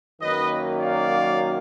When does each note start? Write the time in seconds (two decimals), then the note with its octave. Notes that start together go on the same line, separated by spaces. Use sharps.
0.20 F#2 D#3 F#3 A#3 B4 D#5
0.79 D5 F5